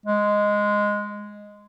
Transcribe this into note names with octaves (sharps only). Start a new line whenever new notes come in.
G#3